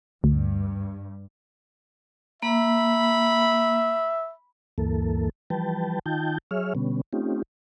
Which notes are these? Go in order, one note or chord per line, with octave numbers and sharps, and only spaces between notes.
D2 G2
A#3 E5 B5
D2 G2 E3 A#3 A4
E3 F3 G3 B4 G5 A5
D#3 D#4 F4 G5 A5 G6
F#3 G#4 C#5 E5 F6
B2 D3 G3 B3 C#4
A3 C4 C#4 D#4 F4 G4